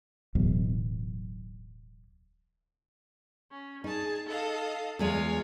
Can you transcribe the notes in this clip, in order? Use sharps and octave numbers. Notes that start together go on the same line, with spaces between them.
D1 B1 E2
C#4
D#4 G#4 A5
A4 D#5 F5
E2 G#3 F4 C#5 D#5 F5